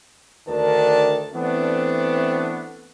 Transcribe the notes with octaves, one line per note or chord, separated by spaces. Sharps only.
D2 D#3 D4 A#4 D5 A5
E3 A3 B3 C4 D4